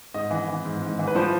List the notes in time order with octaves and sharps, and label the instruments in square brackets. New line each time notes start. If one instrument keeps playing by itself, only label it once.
[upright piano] G#2 D#5
E3
E3
G#2
G#2
E3
B4
F3 C5